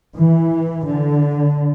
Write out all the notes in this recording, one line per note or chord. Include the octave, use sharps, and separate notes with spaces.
E3
D3